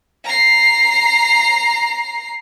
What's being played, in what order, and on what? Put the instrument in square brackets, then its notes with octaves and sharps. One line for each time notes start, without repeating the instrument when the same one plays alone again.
[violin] A#5 C7